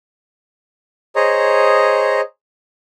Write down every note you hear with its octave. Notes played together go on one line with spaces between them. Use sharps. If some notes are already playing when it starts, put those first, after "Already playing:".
G#4 C5 C#5 D#5 A#5